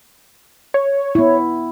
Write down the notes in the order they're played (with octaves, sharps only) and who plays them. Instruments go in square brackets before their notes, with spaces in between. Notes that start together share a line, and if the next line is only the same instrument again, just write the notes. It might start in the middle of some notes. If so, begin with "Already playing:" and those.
[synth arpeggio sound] C#5
[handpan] B3 E4